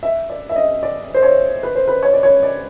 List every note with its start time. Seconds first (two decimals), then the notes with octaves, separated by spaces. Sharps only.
0.03 E5
0.30 D5
0.49 E5
0.56 D#5
0.83 D5
1.14 C5
1.23 C#5
1.63 B4
1.75 C5
1.88 B4
2.03 C#5
2.13 D5
2.23 C#5
2.43 D5